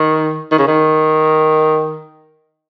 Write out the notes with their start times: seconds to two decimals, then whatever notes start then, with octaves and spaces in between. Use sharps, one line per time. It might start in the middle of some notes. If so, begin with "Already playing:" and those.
Already playing: D#3
0.51 D#3
0.59 C#3
0.68 D#3